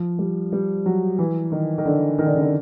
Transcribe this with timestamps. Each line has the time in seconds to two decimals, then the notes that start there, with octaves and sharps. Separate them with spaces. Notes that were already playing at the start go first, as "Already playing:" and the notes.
Already playing: F3
0.19 G3
0.52 G3
0.86 F#3
1.18 E3
1.52 D#3
1.78 D#3
1.85 D3
2.19 D#3
2.26 D3
2.34 C#3
2.41 D3